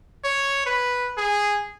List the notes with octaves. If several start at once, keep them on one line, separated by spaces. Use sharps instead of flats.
C#5
B4
G#4